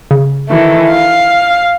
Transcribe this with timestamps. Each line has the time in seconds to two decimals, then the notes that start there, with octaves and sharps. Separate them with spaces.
0.11 C#3
0.48 D#3 E3 A3
0.89 F5